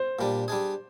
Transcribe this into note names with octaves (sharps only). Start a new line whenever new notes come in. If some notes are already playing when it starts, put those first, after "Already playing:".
Already playing: C5
A#2 G3 D4
G3 D4 G#4